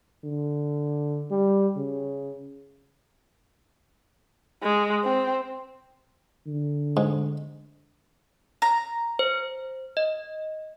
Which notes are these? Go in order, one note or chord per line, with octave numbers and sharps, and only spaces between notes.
D3
G3
C#3
G#3
C4
D3
G#2
A#5
C5
D#5